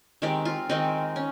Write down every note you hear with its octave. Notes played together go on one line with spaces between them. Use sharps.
D#3 G#3 C4 G4
F4
D#3 G#3 C4 D#4
C#4